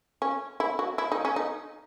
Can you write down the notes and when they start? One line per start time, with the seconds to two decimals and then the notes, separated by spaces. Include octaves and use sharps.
0.22 C#4
0.60 E4
0.79 F#4
0.98 E4
1.12 D#4
1.25 C#4
1.36 D#4